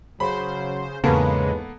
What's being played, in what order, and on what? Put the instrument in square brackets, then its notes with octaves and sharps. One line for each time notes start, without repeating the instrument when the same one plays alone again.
[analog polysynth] C#3 C5 [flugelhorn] F#3 [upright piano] B5
[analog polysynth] E2 G#2 G#3 [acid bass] C#3 [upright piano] A#3 B3 A4 [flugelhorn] B4